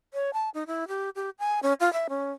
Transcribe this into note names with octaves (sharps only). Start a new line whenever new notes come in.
C#5
A5
D#4
E4
G4
G4
G#5
C#4
F4
E5
C#4